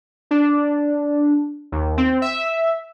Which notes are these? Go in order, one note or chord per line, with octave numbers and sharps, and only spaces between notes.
D4
D#2
C4
E5